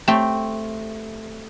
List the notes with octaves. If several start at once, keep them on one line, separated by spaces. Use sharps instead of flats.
A3 C4 G4